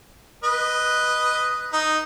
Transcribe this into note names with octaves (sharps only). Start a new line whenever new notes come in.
B4 D#5
D#4